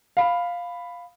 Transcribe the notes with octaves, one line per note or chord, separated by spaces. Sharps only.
F5 B5